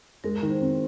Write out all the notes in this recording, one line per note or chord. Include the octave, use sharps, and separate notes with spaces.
G#3 A#4
D#3
C5
C4